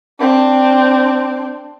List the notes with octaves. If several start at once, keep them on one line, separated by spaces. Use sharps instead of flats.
C4 D4